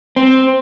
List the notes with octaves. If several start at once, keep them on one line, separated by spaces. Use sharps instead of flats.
C4